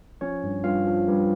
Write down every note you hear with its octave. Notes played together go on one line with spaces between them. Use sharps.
F3 C#4 C#5
G2
G2 F4 F5
F3
G2